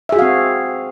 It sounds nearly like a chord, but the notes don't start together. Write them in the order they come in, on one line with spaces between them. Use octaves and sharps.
E5 G#4 F#4 F5 C4